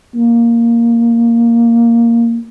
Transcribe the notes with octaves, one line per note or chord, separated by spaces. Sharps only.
A#3